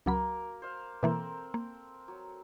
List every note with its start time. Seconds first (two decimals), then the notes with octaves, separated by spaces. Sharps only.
0.06 C#2 F#3 A#3 F#4 A#4 B5
0.62 C5 F5
1.03 B2 E3 A#3 C4 A4 A#4
1.54 A#3
2.08 F#3